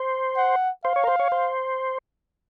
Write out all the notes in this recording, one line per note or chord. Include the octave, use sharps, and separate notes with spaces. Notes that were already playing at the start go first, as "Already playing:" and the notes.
Already playing: C5
F#5
C5 F5
C#5
A#4
C5
C#5
C5